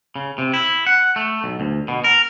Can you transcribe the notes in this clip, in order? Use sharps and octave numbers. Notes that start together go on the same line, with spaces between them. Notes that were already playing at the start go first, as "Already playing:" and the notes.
C#3
C3
E4
F#5
A3
B1
D2
B2
A#4